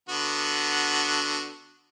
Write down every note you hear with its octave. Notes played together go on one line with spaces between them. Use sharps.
D3 B3 F#4